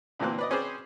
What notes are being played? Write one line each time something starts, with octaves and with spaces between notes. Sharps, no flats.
D2 A#2 E3 A#3 C4 F#6
B4 D5 D#5
C4 C#4 G#4 B4 C5 D5